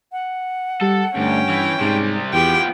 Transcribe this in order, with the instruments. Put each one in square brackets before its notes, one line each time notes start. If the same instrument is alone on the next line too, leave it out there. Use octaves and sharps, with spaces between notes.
[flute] F#5
[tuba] G3 [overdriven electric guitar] A4
[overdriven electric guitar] D2 [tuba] G2 [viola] C#4 G5
[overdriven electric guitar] E3
[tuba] G#2 [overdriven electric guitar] C3 G3
[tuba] E2 [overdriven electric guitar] F3 B3 [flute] G4 [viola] G5